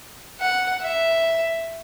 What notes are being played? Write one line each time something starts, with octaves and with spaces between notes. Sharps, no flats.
F#5
E5